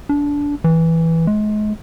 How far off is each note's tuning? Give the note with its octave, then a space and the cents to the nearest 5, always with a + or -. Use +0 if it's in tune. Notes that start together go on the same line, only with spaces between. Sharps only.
D4 -20
E3 -5
G#3 +35